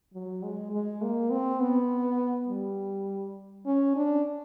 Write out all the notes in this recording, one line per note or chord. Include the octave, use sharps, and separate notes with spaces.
F#3
G#3
G#3
A#3
C4
B3
G3
C#4
D4